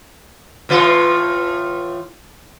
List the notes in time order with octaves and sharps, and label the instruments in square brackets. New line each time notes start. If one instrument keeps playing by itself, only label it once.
[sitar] A2 E3 F4